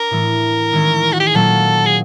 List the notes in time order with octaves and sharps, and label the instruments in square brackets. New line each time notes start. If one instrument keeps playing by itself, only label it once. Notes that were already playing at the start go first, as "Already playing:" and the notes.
Already playing: [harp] D4 [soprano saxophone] A#4
[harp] A2 E3 A3
D#3 G#3 C#4 E4
[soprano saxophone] F#4
G4
G#4
[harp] A#2 F#3 A#3 [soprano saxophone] A4
[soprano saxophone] G#4